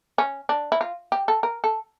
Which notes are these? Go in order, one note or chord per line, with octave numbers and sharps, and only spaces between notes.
C#4
D4
E4
F4
G4
A4
A#4
A4